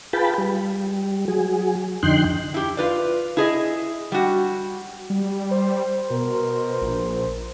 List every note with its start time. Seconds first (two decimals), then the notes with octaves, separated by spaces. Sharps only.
0.13 F4 G#4 B4 G5 A5 B5
0.38 G3
1.28 F#3 G#4
2.03 F2 D3 D#4 G5 C6 F#6
2.54 E4 G4
2.77 F4 B4 D5
3.37 E4 G#4 D#5
4.12 G3 F#4
5.10 G3
5.51 C5
6.10 B2 A#4
6.82 A#1